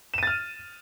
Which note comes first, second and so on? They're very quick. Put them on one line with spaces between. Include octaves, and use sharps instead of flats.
E7 D#7 A6 F6